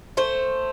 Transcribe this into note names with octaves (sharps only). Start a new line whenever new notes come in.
A3 C5